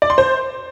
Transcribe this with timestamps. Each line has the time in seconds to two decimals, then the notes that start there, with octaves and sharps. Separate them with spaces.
0.02 D5
0.10 C6
0.18 C5